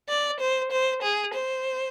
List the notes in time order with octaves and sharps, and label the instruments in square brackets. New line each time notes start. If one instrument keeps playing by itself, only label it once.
[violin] D5
C5
C5
G#4
C5